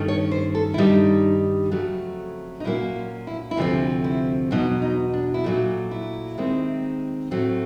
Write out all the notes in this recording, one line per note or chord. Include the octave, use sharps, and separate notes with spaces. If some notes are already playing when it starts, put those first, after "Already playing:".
Already playing: G2 D#3 A3 C#4
C#5
C5
A4
E4
G2 D#3 G3 D#4
F2 C#3 F#3 A3
D#4
A#2 F#3 A#3 C#4 E4
F4
E4
E4
D2 C3 F3 A3 C4 D#4
E4
E2 B2 F#3 D#4
D#4
D4
E4
A#2 F#3 A3 D#4
E4
D#2 D#3 G#3 C4
A2 F#3 A3 C4